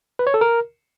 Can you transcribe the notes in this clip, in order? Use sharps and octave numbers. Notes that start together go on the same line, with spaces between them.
B4
C#5
A4
A#4